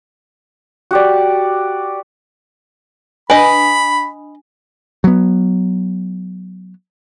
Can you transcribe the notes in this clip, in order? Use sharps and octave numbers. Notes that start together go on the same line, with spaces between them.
F#4 G4 D5
D4 B4 D#5 G#5 B5
F#3 B3